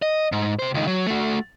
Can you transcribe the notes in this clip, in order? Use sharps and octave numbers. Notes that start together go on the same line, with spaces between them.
D#5
G#2
C3 C5
C#2 D#3
F#3
A3 F#4